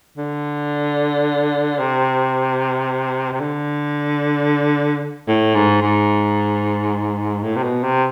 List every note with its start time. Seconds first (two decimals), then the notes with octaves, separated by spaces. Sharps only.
0.18 D3
1.79 C3
3.32 C3
3.40 D3
5.28 A2
5.55 G#2
5.82 G#2
7.43 A2
7.56 C3
7.63 B2
7.83 C3